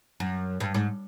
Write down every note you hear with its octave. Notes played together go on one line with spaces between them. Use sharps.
F#2
G2
G#2